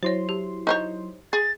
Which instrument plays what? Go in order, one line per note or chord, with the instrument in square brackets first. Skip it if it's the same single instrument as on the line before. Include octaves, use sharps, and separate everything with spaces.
[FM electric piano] F#3 E4 C6 [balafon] C5 C#5
[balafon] G4
[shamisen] D#4 C5 C#5
[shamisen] G#4 [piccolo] A6